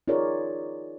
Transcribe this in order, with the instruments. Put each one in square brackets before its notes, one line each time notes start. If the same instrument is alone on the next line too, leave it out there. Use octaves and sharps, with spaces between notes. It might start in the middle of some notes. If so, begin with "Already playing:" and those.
[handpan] D#4 F4 G#4 A#4 C#5 D5